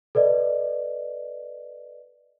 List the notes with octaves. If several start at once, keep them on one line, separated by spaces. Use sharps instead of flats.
A4 B4 D5 D#5